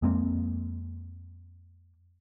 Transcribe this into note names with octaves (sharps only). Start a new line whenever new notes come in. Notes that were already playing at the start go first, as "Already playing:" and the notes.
F2 G#3 A#3 C4